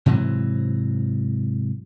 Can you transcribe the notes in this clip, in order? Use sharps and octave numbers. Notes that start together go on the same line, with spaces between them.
G#2 C3 E3 F#3